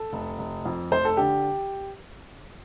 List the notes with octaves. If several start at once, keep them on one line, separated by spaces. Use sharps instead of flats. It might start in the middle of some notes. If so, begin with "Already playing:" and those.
Already playing: A4
F1
F1
F2
F1 C5
A4
D3 G4